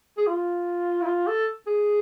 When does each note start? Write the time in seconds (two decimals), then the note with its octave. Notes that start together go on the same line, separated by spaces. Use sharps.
0.18 G#4
0.27 F4
1.02 E4
1.06 F4
1.27 A4
1.67 G#4